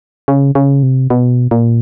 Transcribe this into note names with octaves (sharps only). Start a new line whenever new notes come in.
C#3
C#3
C3
B2
A#2